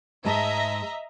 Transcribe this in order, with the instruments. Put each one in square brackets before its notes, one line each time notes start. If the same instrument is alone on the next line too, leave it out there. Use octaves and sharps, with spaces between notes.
[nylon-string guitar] G#2 G#3 A5 [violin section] D#5 E5 A#5